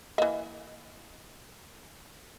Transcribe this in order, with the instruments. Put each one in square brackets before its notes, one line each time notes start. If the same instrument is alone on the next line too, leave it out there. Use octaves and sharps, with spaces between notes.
[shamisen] E3 A#3 [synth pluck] D#5